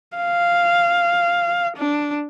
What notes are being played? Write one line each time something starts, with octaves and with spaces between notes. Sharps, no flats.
F5
D4